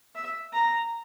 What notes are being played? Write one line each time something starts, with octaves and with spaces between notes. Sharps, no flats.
E5
A#5